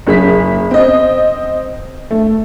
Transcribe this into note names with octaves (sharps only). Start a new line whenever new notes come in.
F#1 G#4 B6
C4 D#5
A3